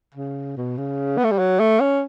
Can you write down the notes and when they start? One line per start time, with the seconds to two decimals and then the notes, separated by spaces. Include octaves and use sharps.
0.15 C#3
0.57 B2
0.78 C#3
1.18 B3
1.24 A3
1.31 G3
1.39 F#3
1.60 A3
1.80 C#4